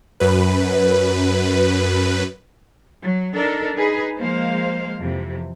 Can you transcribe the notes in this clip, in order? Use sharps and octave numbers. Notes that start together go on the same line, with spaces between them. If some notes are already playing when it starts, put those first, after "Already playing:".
F#2 B4
F#3
D4 D#4 A4 A#4
D#4 G#4 B4
F3 G#3 A#3 C5 F5
F2 C3 E3